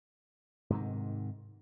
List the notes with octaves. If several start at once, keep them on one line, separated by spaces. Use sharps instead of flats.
G#2 C3 D#3